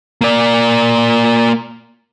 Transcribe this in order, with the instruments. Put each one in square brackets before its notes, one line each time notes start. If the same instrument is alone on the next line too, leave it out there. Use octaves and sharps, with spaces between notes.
[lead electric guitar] A#3 D5